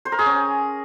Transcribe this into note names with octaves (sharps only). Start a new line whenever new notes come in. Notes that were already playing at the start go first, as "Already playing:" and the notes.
C5
A#4
G#4
C#4